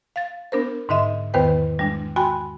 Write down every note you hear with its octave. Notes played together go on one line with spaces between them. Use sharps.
F5 A6
B3 D4 A#4 C5
G#2 D3 D#4 D#5 E5
E2 D#3 B3 B4 C5 G5
G3 G#3 D4
F#4 G5 G#5 B5 C6